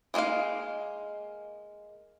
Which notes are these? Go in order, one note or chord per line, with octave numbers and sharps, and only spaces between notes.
E3 G#3 A#3 D#4 F5